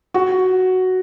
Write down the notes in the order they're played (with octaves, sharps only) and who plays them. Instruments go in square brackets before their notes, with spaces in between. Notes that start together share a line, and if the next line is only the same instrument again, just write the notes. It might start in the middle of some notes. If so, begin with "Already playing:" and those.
[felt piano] F#4